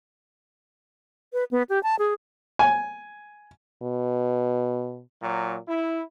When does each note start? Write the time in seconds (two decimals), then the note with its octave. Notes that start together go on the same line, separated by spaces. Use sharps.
1.33 B4
1.51 B3
1.69 G4
1.83 A5
1.99 G#4
2.59 G#5
3.82 B2
5.22 A#2 F#3
5.68 E4